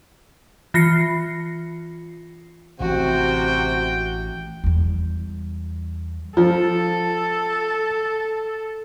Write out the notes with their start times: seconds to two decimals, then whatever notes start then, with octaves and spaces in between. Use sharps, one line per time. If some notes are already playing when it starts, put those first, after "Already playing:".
0.74 E3 F4 A#6 C7 C#7
2.80 A1 C3 F#4 G5
4.64 E2 G3
6.37 F3 A4